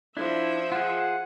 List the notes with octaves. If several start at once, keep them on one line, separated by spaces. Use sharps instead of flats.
F3 D4 E4 E5
F4 G#4 F#5